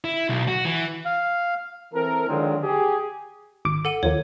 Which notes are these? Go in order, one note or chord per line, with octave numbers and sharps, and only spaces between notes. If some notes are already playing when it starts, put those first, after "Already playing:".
E4
B1
F#4
E3
F5
E3 C4 A4 A#4
D3 D#3 F3 F#3 G#3 C4
G4 G#4
G#1 D6
A4 F#5 D#7
D#2 F3 A#3 C#5